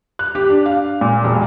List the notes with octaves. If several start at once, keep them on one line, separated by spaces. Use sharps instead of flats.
F#6
G4
D4
F5
A#2
E1